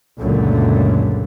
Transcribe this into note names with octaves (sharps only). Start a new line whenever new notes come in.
C#2 F#2 A#2 D3 A3